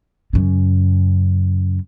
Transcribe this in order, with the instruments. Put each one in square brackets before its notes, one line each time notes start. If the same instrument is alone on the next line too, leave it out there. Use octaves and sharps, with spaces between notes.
[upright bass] F#2 C#3